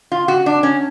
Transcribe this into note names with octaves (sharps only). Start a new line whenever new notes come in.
F4
F#4
D4
C#4